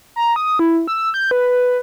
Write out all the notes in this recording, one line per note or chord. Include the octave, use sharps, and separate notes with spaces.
A#5
D#6
E4
E6
G6
B4